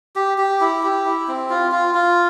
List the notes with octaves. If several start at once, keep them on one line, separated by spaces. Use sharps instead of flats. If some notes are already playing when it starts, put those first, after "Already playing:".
G4
G4
E4
G4
E4
C4
F4
F4
F4